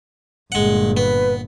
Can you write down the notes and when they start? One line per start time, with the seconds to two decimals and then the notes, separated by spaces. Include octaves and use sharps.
0.52 G1 A#2 G#3 F#5
0.97 B3 B4